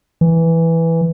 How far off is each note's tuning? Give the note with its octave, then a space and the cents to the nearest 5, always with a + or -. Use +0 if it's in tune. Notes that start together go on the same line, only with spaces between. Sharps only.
E3 +0